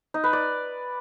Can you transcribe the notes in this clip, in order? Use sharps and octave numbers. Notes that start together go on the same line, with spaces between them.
D#4
B4
D5